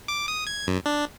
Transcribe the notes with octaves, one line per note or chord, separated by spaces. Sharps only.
D6
D#6
G#6
F#2
D4